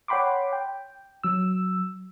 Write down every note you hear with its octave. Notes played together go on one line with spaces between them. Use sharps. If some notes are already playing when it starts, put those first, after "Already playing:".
C#5 F#5 G5 B5 C6 D6
G5
F#3 E6